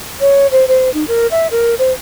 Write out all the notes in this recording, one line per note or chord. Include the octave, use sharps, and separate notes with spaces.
C#5
C5
C5
D#4
A#4
E5
A#4
C5